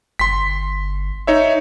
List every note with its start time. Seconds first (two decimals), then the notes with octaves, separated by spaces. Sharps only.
0.19 G1 C6 B6
1.27 D#4 C#5 E5